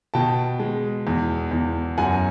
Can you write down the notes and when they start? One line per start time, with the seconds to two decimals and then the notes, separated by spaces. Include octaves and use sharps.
0.14 B2 G5 A5
0.60 G#3
1.07 E2
1.52 E2
1.97 F#2 F#5 G#5